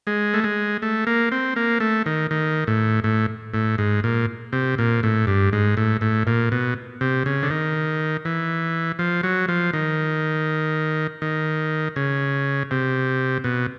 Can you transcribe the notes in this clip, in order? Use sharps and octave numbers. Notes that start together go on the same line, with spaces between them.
G#3
A3
G#3
A3
A#3
C4
A#3
A3
D#3
D#3
A2
A2
A2
G#2
A#2
C3
A#2
A2
G2
G#2
A2
A2
A#2
B2
C3
C#3
D3
D#3
E3
F3
F#3
F3
D#3
D#3
C#3
C3
B2